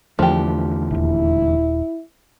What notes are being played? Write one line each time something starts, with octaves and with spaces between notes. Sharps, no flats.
E2 D3 F3 A3 G4
D#1 G#1 E4